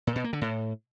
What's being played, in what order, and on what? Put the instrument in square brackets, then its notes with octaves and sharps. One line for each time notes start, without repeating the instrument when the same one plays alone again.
[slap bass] A#2
B2
A#3
D3
A2